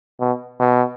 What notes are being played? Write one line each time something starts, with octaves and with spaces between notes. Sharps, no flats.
B2
B2